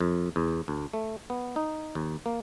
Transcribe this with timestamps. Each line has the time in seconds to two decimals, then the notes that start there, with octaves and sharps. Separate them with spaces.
0.01 F2
0.36 E2
0.68 D2
0.93 A3
1.30 B3
1.56 D#4
1.95 D#2
2.26 A#3